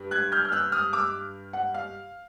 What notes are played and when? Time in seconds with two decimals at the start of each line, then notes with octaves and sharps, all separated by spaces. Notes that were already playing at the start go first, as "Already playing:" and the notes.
Already playing: G2
0.11 F#6 G#6
0.32 F6 G6
0.45 F6
0.52 E6 F#6
0.72 D#6 F6
0.93 D6 E6
1.53 F#5
1.74 F5